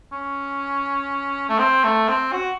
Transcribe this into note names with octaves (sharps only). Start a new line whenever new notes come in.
C#4
A3
C4
A3
C4
F#4